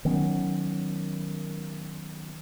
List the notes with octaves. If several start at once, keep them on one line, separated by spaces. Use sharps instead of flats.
D#3 F#3 B3 C#4